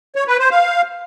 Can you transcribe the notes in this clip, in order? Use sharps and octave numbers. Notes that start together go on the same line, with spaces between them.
C#5
B4
C5
F5